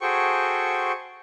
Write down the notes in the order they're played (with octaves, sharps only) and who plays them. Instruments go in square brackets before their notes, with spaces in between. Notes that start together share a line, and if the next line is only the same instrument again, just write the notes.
[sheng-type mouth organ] F#4 G#4 A4 C5 G5 C#6